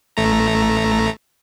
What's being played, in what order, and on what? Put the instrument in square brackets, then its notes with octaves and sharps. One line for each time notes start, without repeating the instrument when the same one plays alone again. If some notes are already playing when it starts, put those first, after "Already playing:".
[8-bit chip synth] A1 A3 A#5